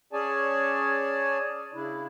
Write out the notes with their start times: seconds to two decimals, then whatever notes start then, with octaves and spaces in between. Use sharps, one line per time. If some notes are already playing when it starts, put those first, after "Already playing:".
0.13 C#4 G#4 C#5 D5 G#5 A5
1.74 C#3 D4 E4